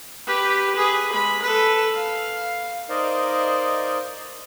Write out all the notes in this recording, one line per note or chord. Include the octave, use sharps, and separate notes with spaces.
G4 B4
G#4 B4
G#3 B5
A4 B4
F5
D#4 A#4 C5 D5 D#5 F5